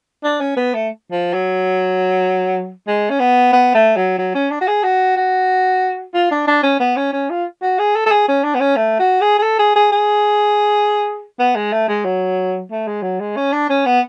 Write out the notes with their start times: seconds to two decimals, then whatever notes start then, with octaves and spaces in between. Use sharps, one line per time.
0.24 D4
0.40 C#4
0.57 B3
0.74 A3
1.11 F3
1.33 F#3
2.87 G#3
3.10 C#4
3.20 B3
3.53 B3
3.75 A3
3.96 F#3
4.18 F#3
4.35 C#4
4.51 D4
4.61 F#4
4.67 G#4
4.83 F#4
5.16 F#4
6.14 F4
6.31 D4
6.47 D4
6.63 C#4
6.80 B3
6.96 C#4
7.13 C#4
7.30 F4
7.62 F#4
7.79 G#4
7.96 A4
8.06 A4
8.11 G#4
8.28 C#4
8.44 D4
8.55 B3
8.60 C#4
8.76 A3
8.99 F#4
9.21 G#4
9.39 G#4
9.43 A4
9.59 G#4
9.76 G#4
9.92 G#4
11.39 B3
11.56 G#3
11.73 A3
11.88 G#3
12.05 F#3
12.71 A3
12.87 G#3
13.03 F#3
13.20 G#3
13.36 C#4
13.53 D4
13.69 C#4
13.86 B3